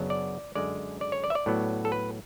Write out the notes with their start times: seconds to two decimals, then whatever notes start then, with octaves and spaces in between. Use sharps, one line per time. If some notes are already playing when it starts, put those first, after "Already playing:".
Already playing: F#2 C#3 F#3 B3 D4
0.10 D5
0.55 F#2 D3 G#3 D5
1.01 D5
1.12 C#5
1.24 D5
1.30 E5
1.35 D5
1.46 A2 F#3 B3
1.85 A4
1.92 B4